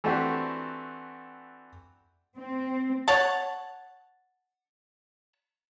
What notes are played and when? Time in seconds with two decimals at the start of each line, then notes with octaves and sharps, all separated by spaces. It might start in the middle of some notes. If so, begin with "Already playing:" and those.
0.04 E3 A3 C4 D4 F#4 G4
2.37 C4
3.08 C#5 F#5 A5